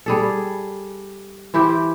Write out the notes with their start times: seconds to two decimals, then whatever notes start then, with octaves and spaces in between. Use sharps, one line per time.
0.06 G3 G#4 A4
1.54 E3 E4 G4 C5